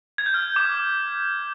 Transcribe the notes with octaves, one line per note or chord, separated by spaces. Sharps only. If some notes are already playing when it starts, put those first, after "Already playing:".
G#6
G6
F6
D6